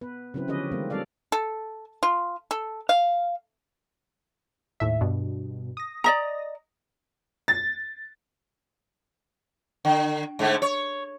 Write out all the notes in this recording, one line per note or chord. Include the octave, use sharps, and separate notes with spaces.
B3 B4
C#3 F#3 C4 E4 B4
D3 F3 C#4 G4 B4 D#5
D#3 G3 G#3 A#3 C4
G3 C4 D4 A4 D5 F5
A4
F4
A4
F5
D#2 A2 E5
G2 B2
D#6 A#6
D5 D#5 A#5
A6
D3
G#2 D3 A3
C#5